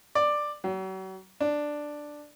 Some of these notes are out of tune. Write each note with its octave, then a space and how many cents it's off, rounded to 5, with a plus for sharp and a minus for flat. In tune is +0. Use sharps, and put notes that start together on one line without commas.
D5 +10
F#3 +40
D4 +5